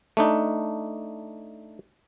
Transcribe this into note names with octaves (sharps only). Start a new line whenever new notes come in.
A3 D4 D#4